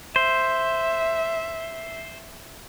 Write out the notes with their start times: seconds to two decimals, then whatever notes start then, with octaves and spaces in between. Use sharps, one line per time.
0.16 C5 E5